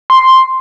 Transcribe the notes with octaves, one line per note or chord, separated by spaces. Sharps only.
C6